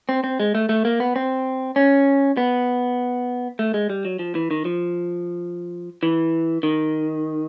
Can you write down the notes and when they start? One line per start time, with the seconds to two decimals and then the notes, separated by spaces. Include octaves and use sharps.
0.09 C4
0.24 C4
0.40 G#3
0.55 A3
0.69 A3
0.85 A#3
1.00 B3
1.16 C4
1.76 C#4
2.37 B3
3.59 A3
3.74 G#3
3.90 G3
4.05 F#3
4.19 F3
4.35 E3
4.51 D#3
4.65 F3
6.03 E3
6.63 D#3